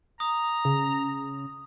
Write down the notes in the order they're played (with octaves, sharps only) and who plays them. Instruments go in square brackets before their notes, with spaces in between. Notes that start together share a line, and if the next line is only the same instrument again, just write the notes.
[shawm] A#5 [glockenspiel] D#6
[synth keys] C#3